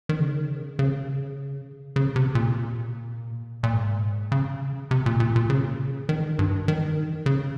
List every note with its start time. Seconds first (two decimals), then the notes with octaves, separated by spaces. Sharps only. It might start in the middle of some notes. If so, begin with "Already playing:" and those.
0.09 D#3
0.20 C#3
0.79 C#3
1.96 C#3
2.16 C3
2.35 A#2
3.63 A#2
3.73 G#2
4.32 C#3
4.91 C3
5.06 A#2
5.20 A#2
5.36 A#2
5.50 C#3
6.09 D#3
6.39 G2
6.68 D#3
7.26 C#3